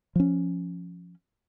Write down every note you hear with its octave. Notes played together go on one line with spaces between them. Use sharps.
F3 C#4